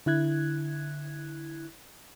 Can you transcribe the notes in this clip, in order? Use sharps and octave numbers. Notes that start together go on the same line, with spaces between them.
D3 E4 F#6 G#6